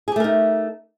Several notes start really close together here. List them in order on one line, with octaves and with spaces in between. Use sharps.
G#4 G4 A3 A#4 D#4